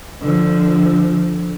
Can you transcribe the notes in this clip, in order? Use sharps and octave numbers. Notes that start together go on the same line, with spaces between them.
D3 F3